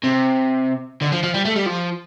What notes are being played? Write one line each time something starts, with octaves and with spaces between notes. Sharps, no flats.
C3
D3
F3
F3
G3
A3
G3
F3